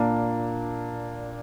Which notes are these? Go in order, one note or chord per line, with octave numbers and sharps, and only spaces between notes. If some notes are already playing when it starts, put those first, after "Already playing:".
Already playing: A#2 A#3 D4